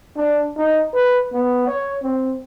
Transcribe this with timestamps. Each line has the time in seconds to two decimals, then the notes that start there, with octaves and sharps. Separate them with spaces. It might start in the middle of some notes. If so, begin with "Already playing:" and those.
0.16 D4
0.56 D#4
0.94 B4
1.32 B3
1.67 C#5
2.03 C4